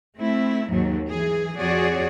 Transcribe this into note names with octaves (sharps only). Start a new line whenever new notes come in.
A3 C4 E4
D#2 G#2 F#3
E3 G#4
F2 F#4 G#4 C#5 D5